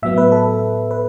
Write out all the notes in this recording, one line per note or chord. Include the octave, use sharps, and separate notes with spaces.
A2 F#3 B3 E5
B4
A4
B4